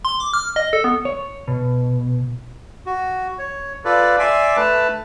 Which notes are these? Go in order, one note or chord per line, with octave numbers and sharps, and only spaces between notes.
C6
D6
F6
D#5
A4
B3
C#5
B2
F#4
C#5
F4 A4 B4 D5
D5 E5 G#5 C6 D6
A3 B4 A5